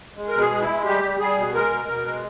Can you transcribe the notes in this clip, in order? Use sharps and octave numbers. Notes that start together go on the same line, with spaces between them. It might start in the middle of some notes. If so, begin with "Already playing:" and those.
G#3
A#4
B2
G#4
G#3
E4
G#3
G3 G4
G3
G3 G#4
B2
G#3 A#4
B2
B2
G#3